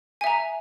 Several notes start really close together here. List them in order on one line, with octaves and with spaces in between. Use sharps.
G#5 E5 A#5